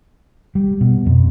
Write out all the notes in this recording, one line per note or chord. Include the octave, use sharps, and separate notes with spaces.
G3
B2
F2